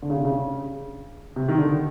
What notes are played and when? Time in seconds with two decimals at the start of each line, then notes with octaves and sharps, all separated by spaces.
0.02 D3
0.10 C#3
0.17 C3
0.25 C#3
1.36 C3
1.49 D#3
1.58 D3